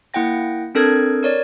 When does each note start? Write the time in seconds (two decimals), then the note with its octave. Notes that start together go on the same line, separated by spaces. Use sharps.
0.14 A#3 E4 F#5 G5 A#6
0.75 C4 D4 A4 A#4 D#6 G#6
1.23 A#4 C#5 D5